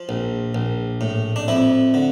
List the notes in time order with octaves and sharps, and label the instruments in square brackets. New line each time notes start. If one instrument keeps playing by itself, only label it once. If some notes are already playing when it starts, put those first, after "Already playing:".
Already playing: [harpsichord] F3 F4
A#1
A#1
A2
D4
F2 E4
D3